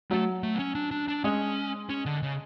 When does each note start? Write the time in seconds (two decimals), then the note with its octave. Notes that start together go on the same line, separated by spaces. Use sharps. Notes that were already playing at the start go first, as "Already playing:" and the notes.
0.11 F#3 A3
0.43 A3
0.55 B3
0.59 C#4
0.75 D4
0.91 D4
1.08 D4
1.24 G#3 C#4
1.89 C#4
2.06 D3
2.22 C#3